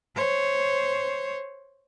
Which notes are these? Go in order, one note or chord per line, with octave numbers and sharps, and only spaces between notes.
C5 C#5